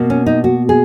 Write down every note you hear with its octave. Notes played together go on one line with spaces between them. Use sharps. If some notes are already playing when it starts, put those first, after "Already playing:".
Already playing: B2 A#3
C#4
D#4
F#4
G#4